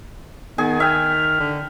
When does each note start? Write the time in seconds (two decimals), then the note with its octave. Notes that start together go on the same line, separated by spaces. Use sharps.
0.58 D#3 B3 G#4 G#5
0.80 E5 G5 F6
1.40 D3